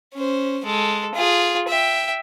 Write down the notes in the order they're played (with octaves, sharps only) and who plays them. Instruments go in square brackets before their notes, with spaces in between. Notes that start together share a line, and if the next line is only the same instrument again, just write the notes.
[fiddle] C#4 C5
G#3 A4
F4 G#4
E5 G5